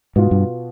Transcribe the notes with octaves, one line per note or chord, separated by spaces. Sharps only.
G#2 B2 B3 F4
G2